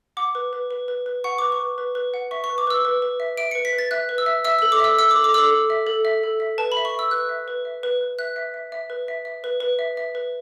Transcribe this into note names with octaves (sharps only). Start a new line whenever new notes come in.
F#5 D6
B4
B4
B4
B4
B4
F#5 C#6
B4 D6
C#6
B4
B4
B4
F#5
E5 C#6
C#6
B4
D6
B4 E6
B4
B4
E5
E5 D7
B4 C#7
B6
B4
A6
E5 F#6
B4
E6
E5
E5 E6
A4 E6
D6
E5 E6
E5 E6
D6
A4
D6
A4 D6 E6
A4
E5
A4
E5
A4
E5
B4 A5
B5
E5
C#6
E5 E6
B4 F#6
E5
B4
E5
B4
B4
E5 F#6
E5
E5
E5
B4
E5
E5
B4
B4
E5
E5
B4